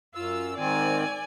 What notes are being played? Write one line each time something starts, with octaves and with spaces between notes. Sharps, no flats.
F#2 F4 E6
G#2 D#3 C4 D5 G#5